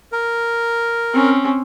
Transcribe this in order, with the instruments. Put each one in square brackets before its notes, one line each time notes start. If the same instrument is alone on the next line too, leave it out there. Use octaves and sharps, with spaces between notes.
[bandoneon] A#4
[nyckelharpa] C4 C#4